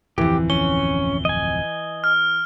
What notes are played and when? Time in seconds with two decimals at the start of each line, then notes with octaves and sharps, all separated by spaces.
0.18 D1 F2 E3 G4
0.50 C#4 G7
1.25 D#5 G#5
2.04 F6